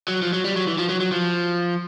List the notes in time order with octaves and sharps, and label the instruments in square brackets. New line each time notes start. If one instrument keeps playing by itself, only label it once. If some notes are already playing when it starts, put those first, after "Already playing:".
[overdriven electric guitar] F#3
F3
F#3
G3
F#3
E3
F3
F#3
F#3
F3